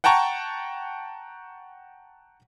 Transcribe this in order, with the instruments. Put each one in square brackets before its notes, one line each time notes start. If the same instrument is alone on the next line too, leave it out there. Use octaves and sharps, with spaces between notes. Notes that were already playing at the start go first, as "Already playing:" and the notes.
[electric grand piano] F#5 G5 A5 A#5 C#6